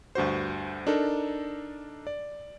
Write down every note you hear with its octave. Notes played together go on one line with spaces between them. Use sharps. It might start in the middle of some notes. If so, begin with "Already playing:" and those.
D2 G2 F#4 C5
D4 D#4 A4 A#4
D5